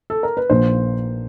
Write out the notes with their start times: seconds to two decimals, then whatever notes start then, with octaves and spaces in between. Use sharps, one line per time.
0.10 A4
0.23 A#4
0.37 B4
0.50 A#1 A#2 F3 A#3 C5